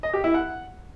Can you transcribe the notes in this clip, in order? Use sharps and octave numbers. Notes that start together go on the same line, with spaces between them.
D#5
G4
E4
F#5